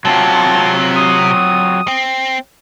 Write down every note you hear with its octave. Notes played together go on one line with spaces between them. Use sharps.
C3 F#3 C4 F4 A5
D#6
C4